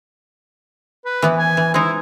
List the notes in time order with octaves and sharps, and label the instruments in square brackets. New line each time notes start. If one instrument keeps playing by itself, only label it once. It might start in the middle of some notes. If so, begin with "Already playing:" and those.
[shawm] B4
[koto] E3 B3 E4
[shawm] G#5
[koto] E3
[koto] G#3 D#4 [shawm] E4